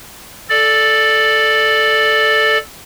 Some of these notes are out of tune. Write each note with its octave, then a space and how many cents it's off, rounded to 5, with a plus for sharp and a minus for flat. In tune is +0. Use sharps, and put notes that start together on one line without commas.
A4 -5 D5 +5